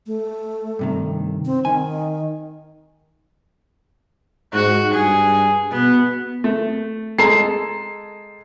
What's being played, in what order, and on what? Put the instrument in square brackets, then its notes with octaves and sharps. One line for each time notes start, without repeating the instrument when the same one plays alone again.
[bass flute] A3
[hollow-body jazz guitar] G2 C3 D#3
[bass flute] C4
[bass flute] D#3 [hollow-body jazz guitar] G#5
[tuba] G#2 [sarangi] F#4
[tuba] G2 [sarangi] G#4
[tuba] B2 [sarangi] B3
[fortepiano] A3
[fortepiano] G#3 A4 A#5 [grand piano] C7